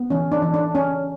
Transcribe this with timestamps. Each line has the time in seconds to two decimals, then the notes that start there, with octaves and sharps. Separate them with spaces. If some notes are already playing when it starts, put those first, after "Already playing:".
Already playing: B3
0.10 E3 C#4
0.32 D4
0.42 E3
0.54 D4
0.75 C#4